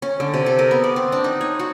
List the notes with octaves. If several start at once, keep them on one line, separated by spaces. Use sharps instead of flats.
C#4
D3
C3
A4
A#4
B3
D5
C4
D4
D#4
C#5
F#4